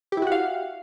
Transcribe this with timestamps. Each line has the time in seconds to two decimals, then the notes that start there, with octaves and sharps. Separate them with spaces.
0.12 G4
0.17 E4
0.22 F#4
0.27 F#5
0.32 F5